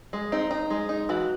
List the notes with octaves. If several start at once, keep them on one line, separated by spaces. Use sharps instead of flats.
G#3
C4 D#4
D#4
G#3
D#4
E3 F#4